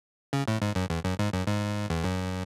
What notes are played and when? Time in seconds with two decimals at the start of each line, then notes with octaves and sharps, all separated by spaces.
0.33 C#3
0.48 A2
0.62 G#2
0.75 F#2
0.90 E2
1.04 F#2
1.19 G#2
1.33 F#2
1.47 G#2
1.90 E2
2.04 F#2